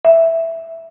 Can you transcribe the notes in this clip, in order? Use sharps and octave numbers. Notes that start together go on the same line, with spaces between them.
E5